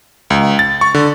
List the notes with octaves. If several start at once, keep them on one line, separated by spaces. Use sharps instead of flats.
C#2
A6
C#6
D3